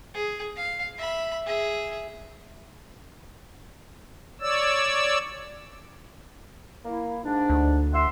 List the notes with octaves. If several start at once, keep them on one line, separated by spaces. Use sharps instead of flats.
G#4
F5
E5 B5
G#4 E5
C#5 D5 E6
A#3 E4
G#2 D4
D2
E5 F#5 C6